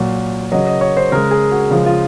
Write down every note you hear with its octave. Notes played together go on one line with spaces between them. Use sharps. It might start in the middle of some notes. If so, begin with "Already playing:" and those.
Already playing: A#2 F#3
C#3 F#3 D#5
D#5
C#5
C5
C#3 G#3 A#4
G#4
F#4
C#3 F3 G#3 F4
F4